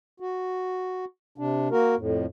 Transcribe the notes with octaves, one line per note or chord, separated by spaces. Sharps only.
F#4
C3 D4
A#3 F#4 A#4
F2 A2